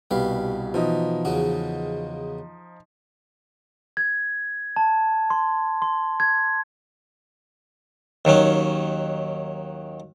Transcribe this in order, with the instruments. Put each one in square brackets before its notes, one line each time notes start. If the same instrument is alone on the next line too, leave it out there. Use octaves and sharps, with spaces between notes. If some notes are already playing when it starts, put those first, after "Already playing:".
[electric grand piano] C2 B2 [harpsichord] G3 B4 F5
[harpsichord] B2 E3 [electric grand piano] F3 D#4 D#5
[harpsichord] E2 C#3 F#4
[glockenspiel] G#6
A5
C6
C6
G#6
[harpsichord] D#2 D#3 F#3 C#4